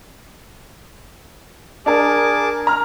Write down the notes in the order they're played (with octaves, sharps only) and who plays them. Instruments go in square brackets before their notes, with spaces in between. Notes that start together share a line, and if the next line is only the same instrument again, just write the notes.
[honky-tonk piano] D4 A#4 [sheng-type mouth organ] G#4 A5 D6
[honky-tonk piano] A#5 F6